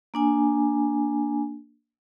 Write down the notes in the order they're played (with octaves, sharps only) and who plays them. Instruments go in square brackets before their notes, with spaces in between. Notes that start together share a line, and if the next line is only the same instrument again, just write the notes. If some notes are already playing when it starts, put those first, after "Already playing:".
[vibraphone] A#3 D4 G#5